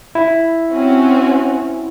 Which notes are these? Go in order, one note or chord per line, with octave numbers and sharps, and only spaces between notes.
E4
C4 C#4 F#4